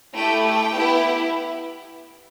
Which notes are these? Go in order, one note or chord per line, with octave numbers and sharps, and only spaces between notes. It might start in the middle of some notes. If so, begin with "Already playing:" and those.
A3 E4 G4 G5
G5
B3 E4 G4